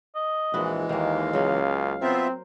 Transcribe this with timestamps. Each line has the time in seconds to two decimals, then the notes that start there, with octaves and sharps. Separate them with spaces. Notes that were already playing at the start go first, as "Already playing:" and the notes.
0.15 D#5
0.54 A#1 E3 G#3 E4 F#4
0.89 D#2 D#3 A#3 F5
1.33 C#2 C#3 F#3 C#4
2.02 B3 C4 F4 A#4 C5 E5